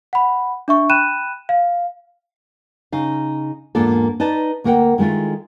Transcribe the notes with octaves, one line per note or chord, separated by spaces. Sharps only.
F#5 B5
D4 E5 C#6
G5 B5 F#6 D#7 E7
F5
C#3 D#4 F5
E2 G#2 A#3 D4 F4 A4
D#4 B4 D5 A5
D2 A#3 A#4 F#5 G5
D#3 G#3 A3 E4 F4